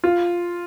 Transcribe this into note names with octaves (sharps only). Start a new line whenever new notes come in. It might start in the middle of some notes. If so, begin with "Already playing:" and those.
F4